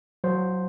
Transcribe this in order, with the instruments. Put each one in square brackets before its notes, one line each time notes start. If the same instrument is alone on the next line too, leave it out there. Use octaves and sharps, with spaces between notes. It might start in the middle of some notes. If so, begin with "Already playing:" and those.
[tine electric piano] F#3 C5